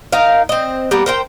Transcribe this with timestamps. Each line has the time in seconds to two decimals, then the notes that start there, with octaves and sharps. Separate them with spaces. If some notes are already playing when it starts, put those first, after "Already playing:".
0.12 D#4 A#4 F5
0.49 C4 D#5
0.91 G3 A#3 B3
1.06 A#4 C5 G5